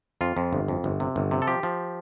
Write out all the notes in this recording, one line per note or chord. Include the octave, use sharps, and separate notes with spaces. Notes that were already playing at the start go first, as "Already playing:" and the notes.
F2 F4
F2
G1
F2
G1
C3
G1
C3
A4
F3 G4
F3